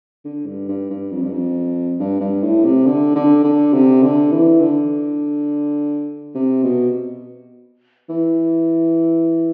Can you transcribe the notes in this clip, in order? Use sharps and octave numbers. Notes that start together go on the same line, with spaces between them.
D3
G2
G2
G2
F2
G2
F2
G2
G2
A2
C3
D3
D3
D3
C3
D3
E3
D3
C3
B2
E3